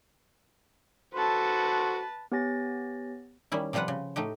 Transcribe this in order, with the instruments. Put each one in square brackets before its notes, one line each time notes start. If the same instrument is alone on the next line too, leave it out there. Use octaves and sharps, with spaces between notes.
[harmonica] F#4 A4 C5 [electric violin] B4 A5
[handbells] B3 G4 C#5 G#5 A6 A#6
[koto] D#3 G3 C#4 E4
C3 F3 G3 F4 B4 F#5
C#3
A2 A3 D#4 G4